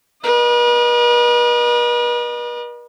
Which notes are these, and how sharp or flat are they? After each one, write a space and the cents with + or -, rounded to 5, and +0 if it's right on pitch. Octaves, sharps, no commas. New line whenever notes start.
B4 -45 D#5 -35